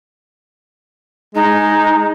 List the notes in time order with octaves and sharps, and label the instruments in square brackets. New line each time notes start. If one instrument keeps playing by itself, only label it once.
[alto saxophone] G#3 [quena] D#4